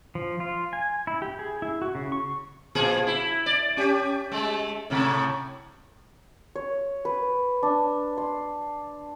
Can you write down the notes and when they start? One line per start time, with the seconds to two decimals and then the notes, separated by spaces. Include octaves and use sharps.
0.15 F3
0.40 F4
0.73 G#5
1.07 E4
1.22 G4
1.39 G#4
1.62 E4
1.82 F#4
1.95 C#3
2.12 C#6
2.75 A#2 F3 G#4
3.07 E4
3.46 D5
3.77 C#4 G4
4.31 G#3 A3
4.90 A2 C3 A3
6.56 C#5
7.05 B4
7.63 D4
8.17 C6